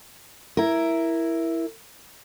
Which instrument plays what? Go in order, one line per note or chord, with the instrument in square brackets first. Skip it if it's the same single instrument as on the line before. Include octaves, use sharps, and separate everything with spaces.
[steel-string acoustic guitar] E4 A#4